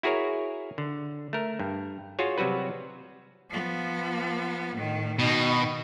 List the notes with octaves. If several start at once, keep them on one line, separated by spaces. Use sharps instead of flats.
E4 F#4 G#4 A#4 C#5
D3
A3 A#4
G2
F4 F#4 G#4 C#5
C3 F#3 G3 F#4 B4
F3 B3
A2 D#3
B2 D#3 D#4